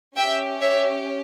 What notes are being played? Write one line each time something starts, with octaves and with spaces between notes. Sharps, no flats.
C#4 G4 E5 G5
C#5 E5